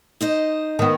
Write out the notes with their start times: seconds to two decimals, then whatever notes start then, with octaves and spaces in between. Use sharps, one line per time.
0.21 D#4 C5 D#5
0.79 D#3 B3